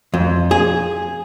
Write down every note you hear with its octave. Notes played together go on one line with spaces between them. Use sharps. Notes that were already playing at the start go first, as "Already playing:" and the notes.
F2
G#4